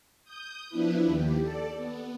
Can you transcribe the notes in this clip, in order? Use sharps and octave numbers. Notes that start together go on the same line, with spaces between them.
D#6 G6
F3 B3 D4 E4 B4
D#2 G4
A4 D5
B3